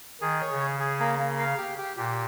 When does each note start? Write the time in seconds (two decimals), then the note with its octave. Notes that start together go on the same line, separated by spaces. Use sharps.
0.21 D#3 G#4
0.41 C#5
0.51 C#3
0.60 G#4
0.79 G#4
1.00 A#3
1.19 A#3
1.39 F5
1.58 G4
1.78 G4
1.97 A#2 G4